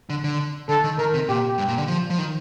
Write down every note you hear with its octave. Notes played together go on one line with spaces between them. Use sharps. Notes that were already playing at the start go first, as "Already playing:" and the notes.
D3
D3
D3 A4
D#3
D#3 A#4
C3
A#2 G4
G2
A#2
D3
F3
F3
D#3